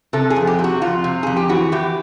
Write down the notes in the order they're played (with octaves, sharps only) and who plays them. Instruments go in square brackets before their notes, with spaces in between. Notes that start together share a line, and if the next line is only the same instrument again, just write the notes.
[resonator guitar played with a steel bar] C3 A4
G#4
F2
G4
C3
F#4
F2 F4
C3
F2 G#4
G4
E3 F#4
E3 G4